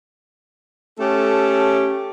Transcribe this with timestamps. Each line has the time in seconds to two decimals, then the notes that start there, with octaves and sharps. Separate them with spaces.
0.99 A3 C#4 G4 A4